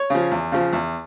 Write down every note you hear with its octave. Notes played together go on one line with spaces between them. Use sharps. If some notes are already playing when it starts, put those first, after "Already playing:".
Already playing: C#5
C#3 F3
E2
C#3 F3
E2